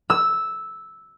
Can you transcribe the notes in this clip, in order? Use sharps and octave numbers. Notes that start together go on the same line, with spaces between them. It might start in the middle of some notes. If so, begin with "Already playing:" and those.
E6